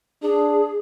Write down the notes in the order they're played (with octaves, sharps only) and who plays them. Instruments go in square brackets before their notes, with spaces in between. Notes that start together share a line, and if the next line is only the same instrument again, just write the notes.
[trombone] D4 [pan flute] G#4